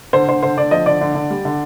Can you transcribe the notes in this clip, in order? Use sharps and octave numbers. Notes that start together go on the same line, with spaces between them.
D3 C5
D3 C5
D3 C5
D3 D5
F3 D#5
D3 D5
D3
D3
G3
D3